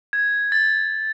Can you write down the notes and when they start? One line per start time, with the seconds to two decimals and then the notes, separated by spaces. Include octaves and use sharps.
0.13 G#6
0.52 A6